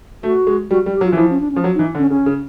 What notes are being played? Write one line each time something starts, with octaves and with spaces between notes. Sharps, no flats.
A3 F#4
G#3
G3 F#4
G3
G4
F#3
F4
E3
F3 E4
C#4
D4
C#4
F3
F#3
D#4
E3
D3
C#4
C#3 C#4
C#3